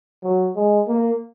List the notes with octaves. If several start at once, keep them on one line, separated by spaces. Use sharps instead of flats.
F#3
G#3
A#3